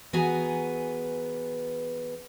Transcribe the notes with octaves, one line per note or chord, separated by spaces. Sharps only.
E3 B3 F#4 G#4 G#5 A#5